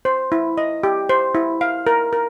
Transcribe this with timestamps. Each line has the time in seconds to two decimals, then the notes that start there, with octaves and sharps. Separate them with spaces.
0.05 C5
0.32 E4
0.58 D#5
0.83 G4
1.09 C5
1.35 E4
1.61 F5
1.87 A#4
2.13 A#4